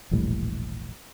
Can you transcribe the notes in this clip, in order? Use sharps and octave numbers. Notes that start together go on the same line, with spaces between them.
E1 A#1 A2 G3